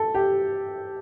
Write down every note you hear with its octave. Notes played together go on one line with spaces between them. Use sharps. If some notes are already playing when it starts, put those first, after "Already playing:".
Already playing: A4
G4